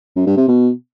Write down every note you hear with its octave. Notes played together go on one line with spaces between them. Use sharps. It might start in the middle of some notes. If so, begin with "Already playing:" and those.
F#2
G2
C3
B2